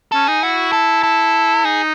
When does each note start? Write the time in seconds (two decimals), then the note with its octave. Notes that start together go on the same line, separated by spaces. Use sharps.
0.12 C#4 A4
0.27 D#4 G#4
0.43 E4 F#4
0.73 A4
1.03 A4
1.64 D#4 G#4